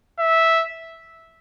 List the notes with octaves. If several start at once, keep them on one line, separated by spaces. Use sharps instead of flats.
E5